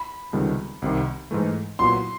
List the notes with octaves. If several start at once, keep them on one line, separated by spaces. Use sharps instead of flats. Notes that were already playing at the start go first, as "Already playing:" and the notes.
Already playing: B5
C#2 C3 D#3 G3 B3
C2 C3 D#3
G#2 E3 A3
A#2 F#3 B3 E4 C6